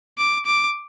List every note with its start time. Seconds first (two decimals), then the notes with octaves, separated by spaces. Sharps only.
0.18 D6
0.46 D6